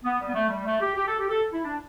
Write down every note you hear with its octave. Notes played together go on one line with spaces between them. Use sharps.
B3
G3
B3
A3
G3
A3
G4
G4
A4
G4
A4
E4
D4